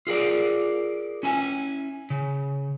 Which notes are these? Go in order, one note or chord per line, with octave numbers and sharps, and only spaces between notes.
F4 G#4 A#4 D5
C#4 E4 G#5
C#3